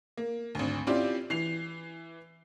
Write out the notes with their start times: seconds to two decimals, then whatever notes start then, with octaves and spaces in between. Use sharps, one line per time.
0.17 A#3
0.55 G#1 D2
0.87 C4 C#4 E4 F4 G4 D5
1.30 E3 C7 F7